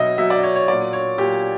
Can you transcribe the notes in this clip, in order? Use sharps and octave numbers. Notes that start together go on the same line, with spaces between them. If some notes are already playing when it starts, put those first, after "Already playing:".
Already playing: B2 F#3 D#5 E5
B2 F#3 E5
D5
C#5
C#5
A#2 F#3 D5
C#5
A#2 F#3 G4